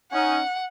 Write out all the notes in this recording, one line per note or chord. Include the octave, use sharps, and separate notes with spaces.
C#4 D#4 F#5